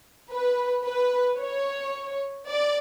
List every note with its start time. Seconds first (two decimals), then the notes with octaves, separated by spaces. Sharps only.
0.30 B4
0.84 B4
1.39 C#5
2.49 D5